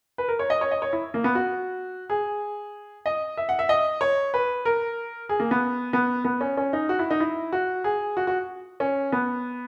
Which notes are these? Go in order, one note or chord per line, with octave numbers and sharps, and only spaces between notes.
B4
A#4
C#5
D#5
C#5
D#5
C#5
E4
A#3
B3
F#4
G#4
D#5
E5
F#5
E5
D#5
C#5
B4
A#4
G#4
A#3
B3
B3
B3
C#4
C#4
D#4
F#4
E4
D#4
E4
F#4
G#4
F#4
F#4
C#4
B3